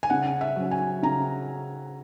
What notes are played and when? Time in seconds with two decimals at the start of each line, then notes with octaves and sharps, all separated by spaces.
0.03 G#5
0.10 C#3 F#5
0.41 E5
0.56 F#3 C#4
0.71 G#5
1.03 C#3 A#5